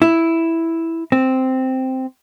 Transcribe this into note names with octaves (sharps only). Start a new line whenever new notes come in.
E4
C4